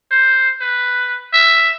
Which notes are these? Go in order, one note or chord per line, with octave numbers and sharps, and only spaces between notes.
C5
B4
E5